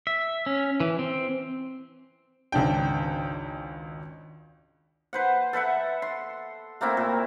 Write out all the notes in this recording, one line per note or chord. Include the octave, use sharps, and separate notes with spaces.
E5
C#4
E3
C4
G#1 C#2 D4 G5
B4 C5 F#5
A4 B4 E5 F#5
C6
A3 A#3 C4 E4
A#2